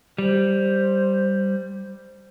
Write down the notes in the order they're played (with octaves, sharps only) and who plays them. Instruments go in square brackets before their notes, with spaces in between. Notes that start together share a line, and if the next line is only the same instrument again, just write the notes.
[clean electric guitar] G3 [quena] C5